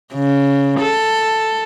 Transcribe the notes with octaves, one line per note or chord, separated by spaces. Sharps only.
C#3
A4